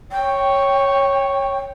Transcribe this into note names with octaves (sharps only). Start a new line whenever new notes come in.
C#5 G5